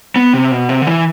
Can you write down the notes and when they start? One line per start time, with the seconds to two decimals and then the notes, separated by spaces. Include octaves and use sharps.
0.16 B3
0.34 C3
0.51 B2
0.69 C3
0.82 D3
0.87 E3